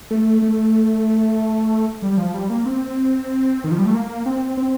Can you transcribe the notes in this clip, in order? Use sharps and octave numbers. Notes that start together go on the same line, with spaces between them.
A3
A3
G3
F3
G3
A#3
C4
D#3
F3
G3
A3
A#3
C4
C4